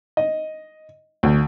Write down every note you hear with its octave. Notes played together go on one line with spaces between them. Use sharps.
D#5
D2